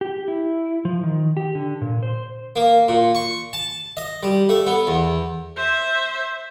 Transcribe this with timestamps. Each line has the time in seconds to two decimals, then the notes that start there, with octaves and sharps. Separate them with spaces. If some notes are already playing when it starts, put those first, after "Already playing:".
0.01 G4
0.28 E4
0.85 F3
1.03 D#3
1.37 G4
1.55 D3
1.81 A#2
2.03 C5
2.56 A#3
2.88 A#2
3.15 C#6
3.53 A5
3.97 D#5
4.23 G3
4.49 A3
4.67 B3
4.87 E2
5.56 C5 E5